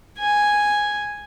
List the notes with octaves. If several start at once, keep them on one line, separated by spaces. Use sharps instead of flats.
G#5